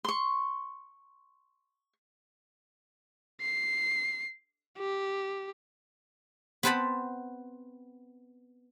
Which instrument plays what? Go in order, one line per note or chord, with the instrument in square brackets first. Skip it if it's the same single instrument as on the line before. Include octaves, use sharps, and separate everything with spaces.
[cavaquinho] C6 C#6
[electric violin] C7
G4
[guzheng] B3 C4 B4 C5 A5 B5